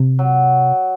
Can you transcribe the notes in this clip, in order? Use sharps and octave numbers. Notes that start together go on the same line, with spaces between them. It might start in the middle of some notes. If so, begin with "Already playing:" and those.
Already playing: C3
F#3